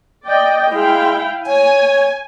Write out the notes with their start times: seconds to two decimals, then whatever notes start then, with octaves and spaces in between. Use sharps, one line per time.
0.26 D5 D#5 G5
0.72 G#3 E4 F5 G5
1.47 C#5 G#5